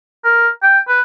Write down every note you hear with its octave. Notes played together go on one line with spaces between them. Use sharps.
A#4
G5
B4